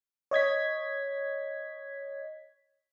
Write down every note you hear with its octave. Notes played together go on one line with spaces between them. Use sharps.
C#5 D#5 G#6 B6